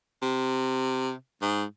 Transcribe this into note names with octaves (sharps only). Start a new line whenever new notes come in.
C3
G#2